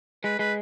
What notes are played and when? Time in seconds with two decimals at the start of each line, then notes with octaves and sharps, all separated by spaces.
0.24 G#3 B4
0.39 G#3 B4